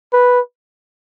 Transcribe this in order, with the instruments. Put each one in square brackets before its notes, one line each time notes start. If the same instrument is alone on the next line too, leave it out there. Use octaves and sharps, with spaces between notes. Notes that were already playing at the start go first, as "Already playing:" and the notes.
[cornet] B4